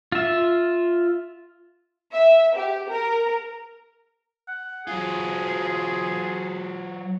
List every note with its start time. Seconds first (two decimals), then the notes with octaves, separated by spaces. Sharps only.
0.12 F4 E5
2.12 E5
2.55 G4
2.89 A#4
4.48 F#5
4.87 F#3 F4 G#4